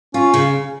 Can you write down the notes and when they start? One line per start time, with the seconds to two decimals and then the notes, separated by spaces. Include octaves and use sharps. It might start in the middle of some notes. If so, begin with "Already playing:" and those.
0.14 C#4 F4
0.34 C#3